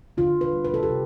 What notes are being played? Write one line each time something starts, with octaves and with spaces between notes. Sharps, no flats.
D3 F4
B4
G3
B4
A4
G4
C3